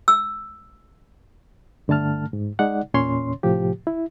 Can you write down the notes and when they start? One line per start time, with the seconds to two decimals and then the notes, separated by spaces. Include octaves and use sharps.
0.08 E6
1.88 G2 D3 A3 A5 F6
2.33 G#2
2.59 G#3 D#4 D5 F#5
2.94 E2 A#2 C#4 C#5 C6
3.43 A2 C3 F3 G4
3.87 E4